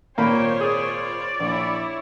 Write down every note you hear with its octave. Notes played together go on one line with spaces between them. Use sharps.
G#1 A#2 A#3 F4 C5 C#5 G5 B5
G#4 D5
A#1 E4 C#5